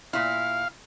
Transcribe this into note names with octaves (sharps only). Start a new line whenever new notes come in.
A#2 E4 F5